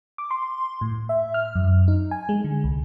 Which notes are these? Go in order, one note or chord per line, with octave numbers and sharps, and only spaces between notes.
D6
C6
A2
E5
F6
F#2
D#4
G#5
G#3
D3
C2